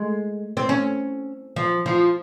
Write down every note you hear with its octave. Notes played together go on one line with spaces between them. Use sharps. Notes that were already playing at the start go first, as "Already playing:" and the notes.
Already playing: G#3
C4
C#4
F3
F3